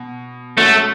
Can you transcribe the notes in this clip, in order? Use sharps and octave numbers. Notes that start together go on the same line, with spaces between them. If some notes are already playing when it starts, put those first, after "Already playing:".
Already playing: B2
G#3 A3 C#4 F#4 A4